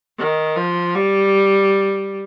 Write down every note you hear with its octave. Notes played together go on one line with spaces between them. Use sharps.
D#3
F3
G3